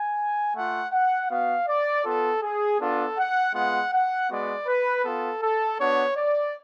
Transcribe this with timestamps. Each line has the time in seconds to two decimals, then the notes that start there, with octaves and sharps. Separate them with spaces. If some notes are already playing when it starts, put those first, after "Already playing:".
Already playing: G#5
0.56 A3 F4 F#5
0.93 F#5
1.30 B3 F#4 F5
1.68 D5
2.05 B3 F4 A4
2.43 G#4
2.80 B3 D4 F4 A4
3.18 F#5
3.54 G#3 B3 F4 F#5
3.93 F#5
4.29 G#3 B3 F#4 D5
4.67 B4
5.04 B3 F4 A4
5.41 A4
5.79 B3 D4 F#4 C#5
6.17 D5